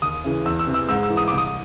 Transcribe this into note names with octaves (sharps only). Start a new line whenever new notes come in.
D#2 D#6
C#3 E3
E2 E6
E6
C3 E3
E6
G#2 E6
E6
E3
D#6
C2 D6
D#6